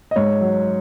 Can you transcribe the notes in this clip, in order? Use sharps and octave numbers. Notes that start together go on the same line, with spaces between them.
D#5
G#2 C#5
F#3